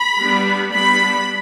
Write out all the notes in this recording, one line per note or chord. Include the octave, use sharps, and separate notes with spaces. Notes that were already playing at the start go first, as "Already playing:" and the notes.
Already playing: B5
G3 B3 D4
G3 B3 D4 B5